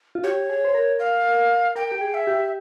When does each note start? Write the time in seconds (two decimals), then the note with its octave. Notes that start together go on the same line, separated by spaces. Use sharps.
0.15 F4
0.24 G4 C#5
0.50 G#4
0.65 C5
0.75 A#4
1.00 F5
1.76 A#4 G5
1.92 G4
2.01 G#4
2.14 E5
2.27 G4